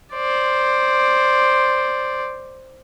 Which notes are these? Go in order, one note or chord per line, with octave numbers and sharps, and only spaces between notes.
C5 D5